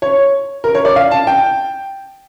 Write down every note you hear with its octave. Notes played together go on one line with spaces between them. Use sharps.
C#5
A#4
C#5
D5
F5
A5
G5